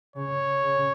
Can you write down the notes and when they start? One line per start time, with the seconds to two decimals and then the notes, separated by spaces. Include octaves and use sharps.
0.16 C#3 C#5
0.64 C#3